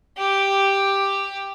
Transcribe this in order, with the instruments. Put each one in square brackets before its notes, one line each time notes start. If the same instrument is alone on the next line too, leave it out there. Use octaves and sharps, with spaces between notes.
[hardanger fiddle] G4